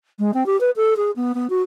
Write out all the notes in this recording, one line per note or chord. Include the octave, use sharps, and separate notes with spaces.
G#3
C4
G4
B4
A4
G#4
B3
B3
F#4